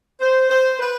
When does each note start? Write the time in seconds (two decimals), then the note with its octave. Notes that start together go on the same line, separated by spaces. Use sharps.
0.20 C5
0.50 C5
0.79 B4